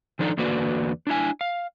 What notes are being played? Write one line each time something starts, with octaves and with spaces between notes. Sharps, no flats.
D#3 F3 D4 D#4 A4
E2 D3 A#3 F#4 B4 D5
D4 E4 G#5
F5